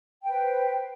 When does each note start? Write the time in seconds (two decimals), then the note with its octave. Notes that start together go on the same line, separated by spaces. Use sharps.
0.22 G5
0.27 B4
0.31 C5